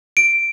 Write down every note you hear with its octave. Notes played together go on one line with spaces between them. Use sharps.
D7